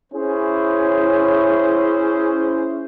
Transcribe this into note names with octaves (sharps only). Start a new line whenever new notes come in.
C#4 E4 G#4 C5